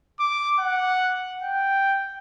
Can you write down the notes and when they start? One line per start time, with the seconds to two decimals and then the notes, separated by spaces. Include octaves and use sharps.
0.20 D6
0.60 F#5
1.42 G5